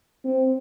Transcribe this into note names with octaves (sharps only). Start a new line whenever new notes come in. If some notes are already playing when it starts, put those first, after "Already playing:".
C4